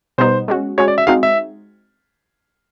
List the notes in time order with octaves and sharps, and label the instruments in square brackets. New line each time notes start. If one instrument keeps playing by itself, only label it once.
[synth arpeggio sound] B2 G3 B3 D#4 [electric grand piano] C5
[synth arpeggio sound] G#3 C#4 F#4
[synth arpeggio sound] G#3 C#4 F#4 [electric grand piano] C#5
[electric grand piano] D5
E5
[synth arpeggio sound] G#3 C4 D#4 F#4 [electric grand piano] F5
[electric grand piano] E5